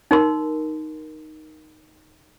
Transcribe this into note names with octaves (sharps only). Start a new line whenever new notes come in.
D#4 A#4 C6